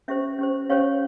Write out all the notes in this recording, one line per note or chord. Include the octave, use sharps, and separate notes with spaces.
C#4 G4 C5 E5
C#4 G4 C5
C#4 G4 C5 C#5 F5